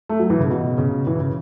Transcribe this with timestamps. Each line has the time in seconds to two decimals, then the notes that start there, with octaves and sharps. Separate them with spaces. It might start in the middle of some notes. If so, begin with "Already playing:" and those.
0.09 A3
0.19 F#3
0.30 E3
0.40 C#3
0.50 B2
0.78 C#3
1.07 E3
1.18 C#3